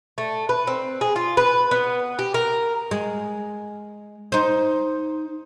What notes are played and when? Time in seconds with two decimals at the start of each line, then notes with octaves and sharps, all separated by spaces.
0.18 A3
0.49 B4
0.67 C4
1.01 G#4
1.16 F4
1.37 B4
1.71 B3
2.19 G4
2.34 A#4
2.91 G#3
4.32 D#4 C5